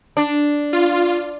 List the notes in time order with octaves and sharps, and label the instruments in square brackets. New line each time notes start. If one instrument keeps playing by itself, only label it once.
[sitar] D4
[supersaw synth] F4